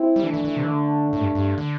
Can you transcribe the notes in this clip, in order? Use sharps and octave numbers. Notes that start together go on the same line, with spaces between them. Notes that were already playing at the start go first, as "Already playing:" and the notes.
Already playing: C4 E4
G3
E3 A3 D4
E3
E3
C3
E3
D3
A2
G2
G2
D3